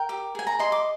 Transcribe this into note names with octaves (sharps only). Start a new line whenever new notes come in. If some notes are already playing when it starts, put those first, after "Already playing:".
Already playing: A#4 G5
G4
G#4 G#5
A#5
D#5 C6
D6